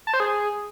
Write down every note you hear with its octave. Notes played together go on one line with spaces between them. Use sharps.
A5
C5
G#4